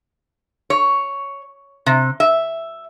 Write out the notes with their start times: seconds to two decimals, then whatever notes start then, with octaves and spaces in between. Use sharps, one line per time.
0.70 C#5
1.86 C3
2.20 E5